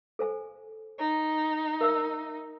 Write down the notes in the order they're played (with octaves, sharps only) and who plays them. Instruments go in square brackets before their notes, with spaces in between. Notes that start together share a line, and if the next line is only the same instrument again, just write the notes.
[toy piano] A4 C5 G#5
[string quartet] D#4
[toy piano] A#4 E5 E6